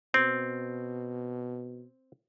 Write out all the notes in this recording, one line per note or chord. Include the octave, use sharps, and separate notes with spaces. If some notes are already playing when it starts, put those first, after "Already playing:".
B2 C4